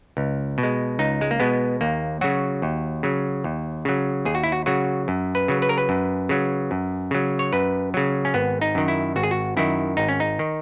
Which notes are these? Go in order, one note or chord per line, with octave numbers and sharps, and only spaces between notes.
C#2
B2
G#3
C#2 D#4
G#3
A#3
B2 G#3 B3
D#2 A#3
C#3 F#3 F#4
D#2
C#3 F#3
D#2
C#3 F#3
D#2 G#4
F#4
E4
F#4
C#3 F#3 F#4
F#2
B4
C#3 F#3
B4
A#4
B4
F#2
C#3 F#3
F#2
C#3 F#3
C#5
F#2 B4
C#3 F#3
C#4
G#1 B3
D#4
F#2 D#3
E4
G#1 F#4
G#4
F#4
F#2 D#3 E4
G#1 D#4
C#4
D#4
D#3